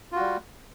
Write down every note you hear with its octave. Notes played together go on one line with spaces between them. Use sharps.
G3 F4 F#4